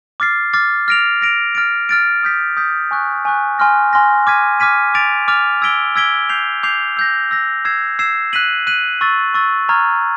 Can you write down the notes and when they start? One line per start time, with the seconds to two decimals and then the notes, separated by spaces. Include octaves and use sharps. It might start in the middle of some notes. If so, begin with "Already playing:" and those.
0.20 D6 F6 A6 C7
0.54 D6 F6 A6 C7
0.88 F6 A#6 D7 F7
1.21 F6 A#6 D7 F7
1.55 F6 A6 D7
1.89 F6 A6 D7
2.23 D#6 G6 B6
2.57 D#6 G6 B6
2.91 G#5 C#6 F#6
3.25 G#5 C#6 F#6
3.58 G#5 C6 F6 A#6
3.93 G#5 C6 F6 A#6
4.27 D6 F6 G#6 B6 D#7
4.60 D6 F6 G#6 B6 D#7
4.94 D6 F6 A6 D7 F7
5.28 D6 F6 A6 D7 F7
5.62 E6 G#6 B6 D7 G7
5.95 E6 G#6 B6 D7 G7
6.29 D6 G6 C7 F7
6.63 D6 G6 C7 F7
6.97 E6 G6 A#6
7.31 E6 G6 A#6
7.65 E6 G#6 C7 E7
7.99 E6 G#6 C7 E7
8.33 F#6 B6 D#7 F#7
8.67 F#6 B6 D#7 F#7
9.01 C#6 E6 A6
9.34 C#6 E6 A6
9.69 A#5 C#6 F6 G#6